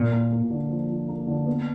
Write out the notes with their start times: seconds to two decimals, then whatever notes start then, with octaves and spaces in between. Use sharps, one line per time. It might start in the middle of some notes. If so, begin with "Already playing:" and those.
Already playing: A#2 A#3
0.12 A#3
0.31 A#3
0.50 D3
0.69 F3
0.89 F3
1.08 A#3
1.27 D3
1.46 B3